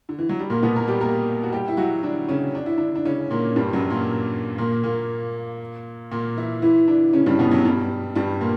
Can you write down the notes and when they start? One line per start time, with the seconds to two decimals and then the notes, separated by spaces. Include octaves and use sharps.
0.09 D3
0.18 E3
0.29 F#3
0.39 G3
0.50 A#2 A#3
0.63 B2 B3
0.75 A#3 A#4
0.88 G3 G4
1.01 A#3 A#4
1.43 F#4
1.52 G3 G4
1.68 E4
1.77 F#3 F#4
2.03 D3 D4
2.28 C#3 C#4
2.55 D4
2.66 E4
2.78 D3 D4
2.95 D4
3.05 C#3 C#4
3.31 A#2 A#3
3.56 G2 G3
3.73 F#2 F#3
3.90 A#2 A#3
4.58 A#2 A#3
4.83 A#2 A#3
6.11 A#2 A#3
6.37 E3 E4
6.62 E3 E4
6.88 D3 D4
7.13 C#3 C#4
7.26 G2 G3
7.39 B2 B3
7.51 F#2 F#3
7.65 G2 G3
8.15 G2 G3
8.41 A#2 A#3